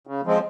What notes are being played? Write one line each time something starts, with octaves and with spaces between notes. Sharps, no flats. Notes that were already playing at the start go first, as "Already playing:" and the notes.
C#3
F3 G#3 C4